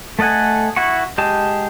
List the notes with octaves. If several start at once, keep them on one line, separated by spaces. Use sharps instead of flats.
A3 A4 D#5 F#5 G#5
E4 F#4 F#5 C#6
G#3 G4 D#5 A5